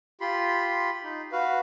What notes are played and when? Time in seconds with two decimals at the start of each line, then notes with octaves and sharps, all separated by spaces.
0.21 F4 G4 B5 C6
1.03 D#4
1.32 F#4 B4 F5